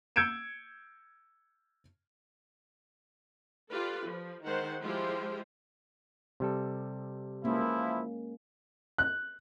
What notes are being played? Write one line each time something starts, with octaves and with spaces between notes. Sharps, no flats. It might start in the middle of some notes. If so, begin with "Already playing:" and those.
E6 G6 G#6 C#7 D7 E7
F4 G4 A4 B4 D5
F3
D#3 G#3 C5 F#5
F3 G#3 E4 F4 G4 C5
C3 G3 A4
E3 F3 G#3 A#3 C#4 E4
F#6